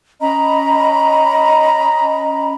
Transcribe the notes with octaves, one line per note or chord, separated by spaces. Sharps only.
C#4 D#5 A#5 B5